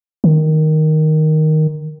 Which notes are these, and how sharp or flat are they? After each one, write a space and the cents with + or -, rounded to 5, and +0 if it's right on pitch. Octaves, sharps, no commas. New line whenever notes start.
D#3 +0